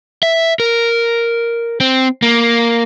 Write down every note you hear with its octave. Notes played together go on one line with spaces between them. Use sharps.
E5
A#4
C4
A#3